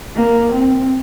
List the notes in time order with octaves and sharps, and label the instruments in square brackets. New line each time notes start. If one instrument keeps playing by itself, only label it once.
[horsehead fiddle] A#3
C4